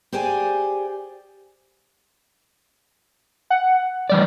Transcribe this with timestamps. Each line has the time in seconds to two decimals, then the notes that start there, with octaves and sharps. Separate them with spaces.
0.12 G4 G#4 C5 D5 G5 G#5
3.50 F#5
4.10 E3 G3 D5